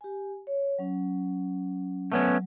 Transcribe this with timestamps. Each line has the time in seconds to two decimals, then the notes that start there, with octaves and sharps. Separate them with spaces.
0.01 G4 G#5
0.47 C#5
0.79 F#3 C#4
2.12 F#3 A3 B3 C#4